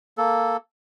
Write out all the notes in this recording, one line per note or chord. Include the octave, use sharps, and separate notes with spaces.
A#3 A4